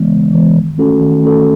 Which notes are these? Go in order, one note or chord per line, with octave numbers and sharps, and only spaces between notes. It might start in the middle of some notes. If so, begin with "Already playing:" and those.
Already playing: C#3 E3 G#3 B3
C#3
E3 G#3 B3
D#3
A3 C#4 F#4 A4
D#3
A3 C#4 F#4 A4